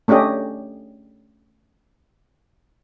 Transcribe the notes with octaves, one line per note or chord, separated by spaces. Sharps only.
A3 C#4 D4 G4 D#5